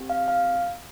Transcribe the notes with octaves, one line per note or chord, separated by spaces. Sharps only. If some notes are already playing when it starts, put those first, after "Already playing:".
Already playing: C4 G4
F5
F5